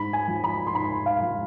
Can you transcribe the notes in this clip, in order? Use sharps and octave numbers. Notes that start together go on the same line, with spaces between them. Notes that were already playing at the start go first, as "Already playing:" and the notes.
Already playing: G#2 B5
G#5
F3
B5
C6
G#2 B5
F5
F3